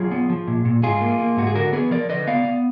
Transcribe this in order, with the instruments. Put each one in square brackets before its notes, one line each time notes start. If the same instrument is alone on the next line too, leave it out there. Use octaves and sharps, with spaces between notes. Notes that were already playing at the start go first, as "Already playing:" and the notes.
Already playing: [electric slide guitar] F#3 F4 G#4
B3
F3
A#2
A#2
G#2 F4 G#4
A#3
A#3
G#2 F#4
G#4
D3 F#4 A#4
B3 G#4 B4
F3 A#4 D5
D3 B4 D#5
B3 D5 F5
B3